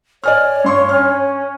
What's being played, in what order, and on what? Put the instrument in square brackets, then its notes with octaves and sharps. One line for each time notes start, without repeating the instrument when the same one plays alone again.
[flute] C#5 [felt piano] D5 G#5 F6
[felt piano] G2 C6 C#6
[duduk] C#4 [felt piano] F6